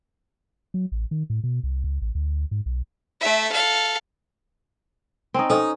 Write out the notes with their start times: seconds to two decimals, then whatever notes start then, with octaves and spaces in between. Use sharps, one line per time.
0.74 F#3
0.92 A1
1.11 D#3
1.30 A2
1.44 B2
1.63 C2
1.84 C#2
2.02 A1
2.15 D2
2.51 G#2
2.66 B1
3.21 A3 E5
3.52 A4 F5
5.34 C4 C#4 D#4
5.50 C#4 D#4 A4 C5 D#5